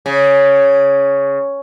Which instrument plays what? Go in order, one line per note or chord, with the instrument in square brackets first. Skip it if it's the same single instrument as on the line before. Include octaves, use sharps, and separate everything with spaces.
[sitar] C#3